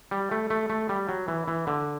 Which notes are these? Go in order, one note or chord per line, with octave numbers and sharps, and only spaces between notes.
G3
A3
A3
A3
G3
F#3
E3
E3
D3